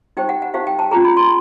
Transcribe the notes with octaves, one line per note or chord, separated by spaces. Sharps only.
D#4 G4 C5 G5
F#5
F#5
D#4 G4 C5 F5
G5
A5
C#4 F4 G#4 A#5
B5
C6